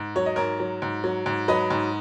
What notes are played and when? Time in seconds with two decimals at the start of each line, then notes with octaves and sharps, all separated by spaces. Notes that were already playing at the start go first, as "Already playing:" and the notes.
Already playing: G#2
0.16 F#3 C#5
0.26 D#5
0.36 G#2 A#4 C#5
0.60 F#3
0.82 G#2
1.04 F#3
1.26 G#2
1.48 F#3 B4 D#5
1.70 G#2